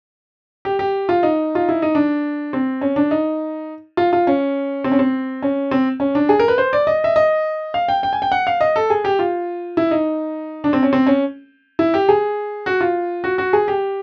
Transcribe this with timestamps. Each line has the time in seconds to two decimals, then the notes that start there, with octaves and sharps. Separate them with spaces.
0.65 G4
0.79 G4
1.09 F4
1.23 D#4
1.55 F4
1.69 E4
1.82 D#4
1.95 D4
2.53 C4
2.81 C#4
2.96 D4
3.11 D#4
3.97 F4
4.13 F4
4.27 C#4
4.84 C4
4.92 C#4
4.99 C4
5.42 C#4
5.71 C4
6.00 C#4
6.15 D4
6.29 G#4
6.39 A#4
6.48 B4
6.58 C5
6.73 D5
6.87 D#5
7.04 E5
7.16 D#5
7.74 F5
7.88 G5
8.03 G5
8.13 G#5
8.22 G5
8.32 F#5
8.47 F5
8.61 D#5
8.76 A4
8.90 G#4
9.04 G4
9.19 F4
9.77 E4
9.91 D#4
10.64 D4
10.73 C4
10.83 C#4
10.93 C4
11.07 C#4
11.79 E4
11.94 G4
12.09 G#4
12.66 F#4
12.81 F4
13.24 F#4
13.38 F#4
13.53 G#4
13.68 G4